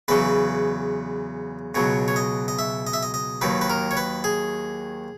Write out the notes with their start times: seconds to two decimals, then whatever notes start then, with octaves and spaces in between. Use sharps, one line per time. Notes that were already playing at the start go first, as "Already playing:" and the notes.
0.08 E2 C#3 F#3 B4
1.75 C#2 B2 F#3 C#5
2.08 C#5
2.16 D#5
2.48 D#5
2.59 E5
2.87 D#5
2.93 E5
3.03 D#5
3.14 D#5
3.41 D#2 D#3 F#3 B4
3.61 B4
3.70 A#4
3.91 C#5
3.97 B4
4.24 G#4